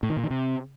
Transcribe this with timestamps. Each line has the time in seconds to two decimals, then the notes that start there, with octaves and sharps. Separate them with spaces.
0.03 A2
0.10 D#3
0.17 A#2
0.24 D#3
0.30 C3